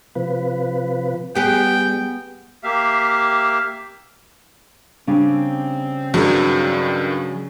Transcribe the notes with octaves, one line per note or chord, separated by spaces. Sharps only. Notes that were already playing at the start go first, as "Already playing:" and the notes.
C3 F3 B4
G3 B3 G4 G#4 G5
A#3 G4 E5 F5
C#3 G3 C4 D4
G2 D#3 F#3 G#4